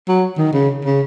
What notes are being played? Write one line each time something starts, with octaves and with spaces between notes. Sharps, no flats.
F#3
D#3
C#3
C#3